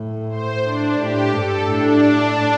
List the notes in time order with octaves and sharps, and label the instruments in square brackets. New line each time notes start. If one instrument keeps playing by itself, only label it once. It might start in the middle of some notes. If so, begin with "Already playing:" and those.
Already playing: [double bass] A2
[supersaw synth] C5
D4
[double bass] A2 [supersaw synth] G4
[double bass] G2 [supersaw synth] A4
[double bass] A2 [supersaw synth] D4